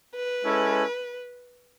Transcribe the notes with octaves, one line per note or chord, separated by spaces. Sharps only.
B4
G#3 C#4 E4 A4